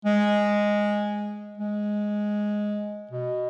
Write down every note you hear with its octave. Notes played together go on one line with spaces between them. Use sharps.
G#3
G#3
B2